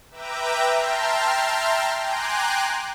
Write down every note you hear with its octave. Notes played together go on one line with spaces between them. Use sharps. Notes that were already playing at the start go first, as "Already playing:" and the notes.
B4 E5 G5 A#5 D6 E6
E5 G5 A5 A#5 C6 F6
G5 G#5 A#5 C6 D6 F#6